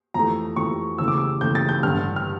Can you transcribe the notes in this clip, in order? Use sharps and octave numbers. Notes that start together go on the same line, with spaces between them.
F2 E3 A3 A#5
F2 E3 A3 C#6
E2 C#3 E3 A3 E6
D6
E6
E2 C#3 E3 A3 G6
A6
G6
A1 G2 D3 F6
F6